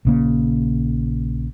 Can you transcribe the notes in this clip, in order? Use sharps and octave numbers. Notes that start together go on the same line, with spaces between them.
A#1 C#3 A#3